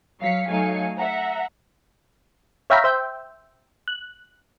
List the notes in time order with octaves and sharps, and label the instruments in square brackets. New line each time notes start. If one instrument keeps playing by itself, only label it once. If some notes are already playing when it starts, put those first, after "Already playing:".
[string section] F#3 F5 B6 C#7
F#3 A3 D#4 F5 G#5 C#7
E5 F#5 A#5
[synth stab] C#5 E5 F5 G5 A#5 B5
C5 E5 G5
F#6